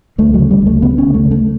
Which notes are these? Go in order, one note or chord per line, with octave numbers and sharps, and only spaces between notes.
D2 A3
F#3
C#3
G3
D2 A3
C#3 B3
C#4
D2
A3
C#3
A3